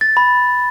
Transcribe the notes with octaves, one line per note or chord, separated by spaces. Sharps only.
A6
B5